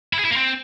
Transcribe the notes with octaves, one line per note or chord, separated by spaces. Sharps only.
E4
G#4
E4
A#3
C4